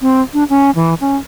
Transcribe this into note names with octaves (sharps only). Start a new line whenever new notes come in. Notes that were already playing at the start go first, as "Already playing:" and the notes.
C4
D4
C#4
E3
C#4